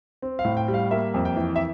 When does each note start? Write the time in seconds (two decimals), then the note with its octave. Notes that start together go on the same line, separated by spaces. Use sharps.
0.22 C4
0.39 F5
0.45 A2
0.57 G5
0.68 G3
0.74 F5
0.91 A#3 E5
1.14 F2
1.25 G5
1.36 E3
1.56 E5